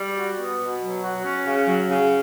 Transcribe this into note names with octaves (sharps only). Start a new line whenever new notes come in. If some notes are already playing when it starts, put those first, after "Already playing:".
Already playing: G3
F#4
B3
B2
F#3
F#4
C#4
C#3
F#3
C#3